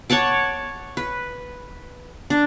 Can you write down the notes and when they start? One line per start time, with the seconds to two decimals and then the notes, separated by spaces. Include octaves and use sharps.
0.10 C#5 F#5 A5 D6
0.97 B4
2.30 D4